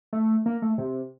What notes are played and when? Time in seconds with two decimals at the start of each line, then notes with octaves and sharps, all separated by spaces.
0.13 A3
0.46 A#3
0.62 A3
0.78 C3